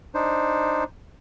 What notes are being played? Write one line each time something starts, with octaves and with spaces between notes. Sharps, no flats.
D4 D#4 C5